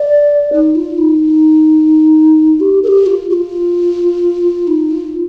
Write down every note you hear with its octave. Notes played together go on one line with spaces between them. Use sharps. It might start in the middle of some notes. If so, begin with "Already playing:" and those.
Already playing: D5
D#4
F4
D#4
G4
A#4
G4
F4
G4
F4
D#4
F4